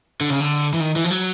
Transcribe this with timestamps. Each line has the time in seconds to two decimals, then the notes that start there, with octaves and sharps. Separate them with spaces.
0.21 D3
0.30 C#3
0.40 D3
0.74 E3
0.80 D#3
0.96 E3
1.04 F3
1.11 F#3